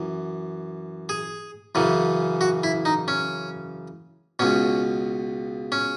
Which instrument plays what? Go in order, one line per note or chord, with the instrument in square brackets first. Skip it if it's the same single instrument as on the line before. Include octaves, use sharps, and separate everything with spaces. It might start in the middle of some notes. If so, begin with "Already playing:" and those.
Already playing: [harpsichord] F#2 E3
G#4
F#2 C#3 E3
F#4
E4
D#4
C#4
C#2 B2 C#4
C#4